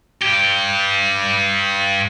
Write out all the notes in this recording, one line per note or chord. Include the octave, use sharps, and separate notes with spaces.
G2 G4